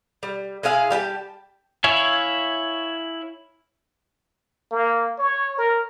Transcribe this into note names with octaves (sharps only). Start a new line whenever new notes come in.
G3
G#3 E4 G#4 F5
G3 G4 F#5 A5
E4 C#5 E5 F5 G#5
A#3
C#5
A#4